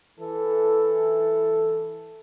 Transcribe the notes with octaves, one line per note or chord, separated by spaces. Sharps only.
E3 A4